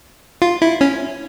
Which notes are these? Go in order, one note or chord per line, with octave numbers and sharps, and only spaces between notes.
F4
E4
C#4